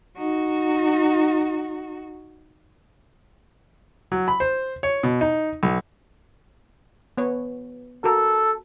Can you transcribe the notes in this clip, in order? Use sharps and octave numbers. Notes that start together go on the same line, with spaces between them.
D#4 F#4
F#3
B5
C5
C#5
B2
D#4
B1
B3 C#5
F#4 A4 A#4